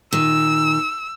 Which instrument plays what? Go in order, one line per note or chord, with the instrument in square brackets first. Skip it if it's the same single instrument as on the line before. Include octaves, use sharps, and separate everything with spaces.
[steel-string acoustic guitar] A#2 D#3 [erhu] E6